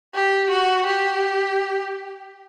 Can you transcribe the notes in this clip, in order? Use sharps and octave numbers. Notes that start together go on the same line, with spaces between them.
G4
F#4
G4